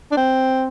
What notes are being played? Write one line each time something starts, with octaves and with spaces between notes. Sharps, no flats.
D4
C4